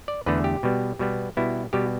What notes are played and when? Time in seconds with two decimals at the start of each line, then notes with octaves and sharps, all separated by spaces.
0.08 D5
0.26 E2 D3 A3 B4
0.44 G4
0.63 B2 G3 B3
0.99 B2 G3 B3
1.37 B2 G3 B3 E4
1.73 B2 G3 B3 G4